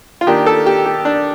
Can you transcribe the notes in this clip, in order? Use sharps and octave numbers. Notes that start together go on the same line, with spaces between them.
F4
D#3 A#3 D4 G4
A4
G4
G4
D4